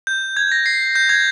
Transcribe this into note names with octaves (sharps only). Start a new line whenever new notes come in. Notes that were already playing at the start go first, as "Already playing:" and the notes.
G6
G#6
A#6
C7
G6
G#6